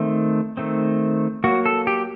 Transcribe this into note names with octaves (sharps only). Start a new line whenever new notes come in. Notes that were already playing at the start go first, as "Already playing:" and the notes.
Already playing: D#3 A3 C4
D#3 A3 C4
F#3 A#3 F#4
A4
G4